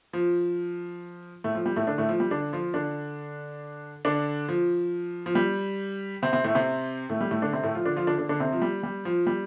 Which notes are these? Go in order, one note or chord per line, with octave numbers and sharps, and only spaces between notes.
F3
A2 A3
F3
G3
A2 A3
D3 D4
A2 A3
F3
G3
D3 D4
F3 F4
D3 D4
D3 D4
F3
F3
G3
C3 C4
C3 C4
A2 A3
C3 C4
A2 A3
G3
A2 A3
D3 D4
C3 C4
A2 A3
F3 F4
D3 D4
F3 F4
D3 D4
D3 D4
D3 D4
C3 C4
F3
G3
G3
F3
G3